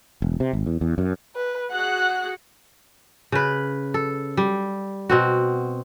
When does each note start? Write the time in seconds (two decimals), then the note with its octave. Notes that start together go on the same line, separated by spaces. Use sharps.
0.22 E1
0.40 C3
0.53 G#1
0.66 E2
0.81 E2
0.98 F#2
1.36 B4
1.72 F#4 G#4 F#5 F#6
3.32 C#3 B4
3.94 A4
4.37 G3
5.09 B2 C4 F#4